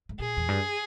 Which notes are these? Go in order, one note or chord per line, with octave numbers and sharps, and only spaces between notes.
G#2
A#2 G#4
E2
G2